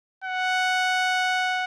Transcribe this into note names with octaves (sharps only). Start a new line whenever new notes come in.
F#5